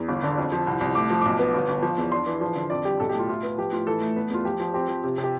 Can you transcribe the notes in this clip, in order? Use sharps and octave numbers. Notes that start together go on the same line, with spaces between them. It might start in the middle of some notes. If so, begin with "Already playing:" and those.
Already playing: E2
G1
D3
F2
F3
C2
C2
A3 D6
F3
B1 D6
B3
G1
G1
F3
E2
D4 C6
E3
F3
D3
F2 D5
G3 G4
B1 A4
G4
A2 F4
E4 F4
B3
F3 G4
A2 F4
E3 A4
A3
B3 B4
E2 F4
F3 G4
F3
C4 G4
F3
C3
C3
G4